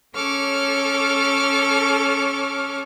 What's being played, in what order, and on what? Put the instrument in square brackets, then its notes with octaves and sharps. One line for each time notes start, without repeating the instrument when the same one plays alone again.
[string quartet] C#4 A4 C#5 D6 F6